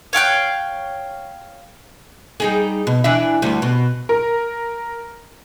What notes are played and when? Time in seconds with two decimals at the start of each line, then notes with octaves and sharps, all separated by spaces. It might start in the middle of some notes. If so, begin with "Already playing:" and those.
0.13 C#5 F5 G5 F#6
2.40 G3 D#4 G#4
2.87 B2
3.04 E3 D4 E5
3.42 D2 G3
3.62 B2
4.09 A#4